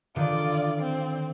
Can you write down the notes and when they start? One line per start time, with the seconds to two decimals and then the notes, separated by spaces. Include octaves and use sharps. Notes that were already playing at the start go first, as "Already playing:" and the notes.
0.16 D3 D#3 F4 D5
0.80 C4